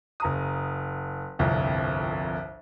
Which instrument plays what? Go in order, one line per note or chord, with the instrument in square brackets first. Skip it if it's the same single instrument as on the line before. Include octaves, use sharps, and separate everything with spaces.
[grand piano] F#1 A#5 D#6
G1 C2 F2